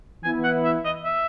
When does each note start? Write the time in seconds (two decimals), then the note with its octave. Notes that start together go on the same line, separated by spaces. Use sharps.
0.24 E3 B3 E4 G#5
0.44 F#5
0.65 E5
0.85 D#5
1.05 E5